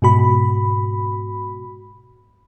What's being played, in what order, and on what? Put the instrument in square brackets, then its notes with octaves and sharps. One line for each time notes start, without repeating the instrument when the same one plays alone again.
[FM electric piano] G#2 B2 F#4 B5